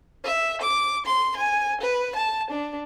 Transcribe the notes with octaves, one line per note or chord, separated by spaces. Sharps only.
E5
D6
C6
G#5
B4
A5
D4